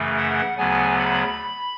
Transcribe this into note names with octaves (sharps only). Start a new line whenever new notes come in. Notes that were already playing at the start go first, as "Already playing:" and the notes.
Already playing: F#2 C#3 E3 A3
F#5
D2 C#3 F#3 B3 G#5
B5